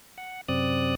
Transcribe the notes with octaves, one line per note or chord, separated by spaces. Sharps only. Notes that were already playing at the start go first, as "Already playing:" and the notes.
F#5
F#2 C3 C4 D5 D#6 F#6